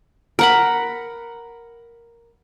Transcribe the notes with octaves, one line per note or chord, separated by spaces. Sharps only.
A#4 F#5 B5